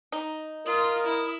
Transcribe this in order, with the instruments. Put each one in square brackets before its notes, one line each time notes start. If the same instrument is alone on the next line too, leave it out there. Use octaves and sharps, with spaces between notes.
[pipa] D#4
[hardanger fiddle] F4 [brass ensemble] A#4 [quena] D#6
[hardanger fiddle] E4